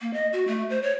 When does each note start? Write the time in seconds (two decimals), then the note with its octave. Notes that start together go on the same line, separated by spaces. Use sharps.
0.01 A#3
0.13 D#5
0.33 F#4
0.48 A3
0.70 C5
0.83 C#5